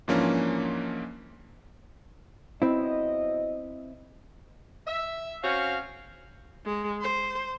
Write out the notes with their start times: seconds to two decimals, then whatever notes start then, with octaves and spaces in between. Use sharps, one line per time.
0.08 G#2 E3 F3 A#3 C#4 D4
2.62 F#3 B3 C4 E4 D#5
4.87 E5
5.42 C4 C#4 F#4 F5
6.65 G#3
7.01 C5